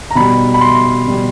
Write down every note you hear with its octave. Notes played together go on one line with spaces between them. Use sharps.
A#5
B2 G3 B5
B5
C6
B2 G3